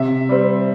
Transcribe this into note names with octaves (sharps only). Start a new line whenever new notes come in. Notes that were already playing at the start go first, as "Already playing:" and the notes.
Already playing: C3 E5
G3 C4